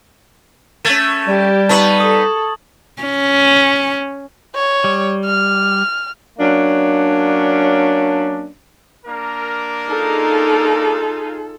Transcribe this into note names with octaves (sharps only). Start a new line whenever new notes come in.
A3 C#4 G#6 A6 E7
G3 G4
B3 D#4 B4 A5 C#6 F#7
A4 D#6
C#4
C#5
G3
F6
F#3 A#3 C#4 D4
A#3 D4 A#4
D#4 F4 G#4 A4